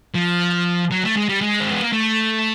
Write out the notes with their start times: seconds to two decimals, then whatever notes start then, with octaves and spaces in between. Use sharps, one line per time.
0.15 F3
0.91 F#3
1.04 A3
1.16 G#3
1.29 G3
1.41 G#3
1.60 C4
1.71 B3
1.81 A#3
1.92 A3